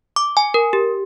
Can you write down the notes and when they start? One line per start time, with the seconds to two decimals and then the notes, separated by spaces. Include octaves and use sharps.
0.16 D6
0.37 G#5
0.54 A#4
0.73 G4